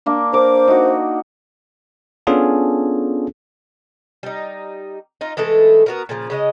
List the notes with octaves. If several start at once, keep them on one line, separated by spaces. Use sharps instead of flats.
A#3 D4
A#4 C5 D6
D#4 F#4
B3 C#4 D4 F4 G#4 A4
G3 D#4
D#4 F4
E3 G#3 A3 A4
B3 F#4 A#4
A#2 C#3 F3
C#3 G#3 D#5